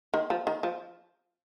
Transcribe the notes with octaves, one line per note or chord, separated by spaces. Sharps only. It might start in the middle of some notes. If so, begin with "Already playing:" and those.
D#3
F3
D#3
F3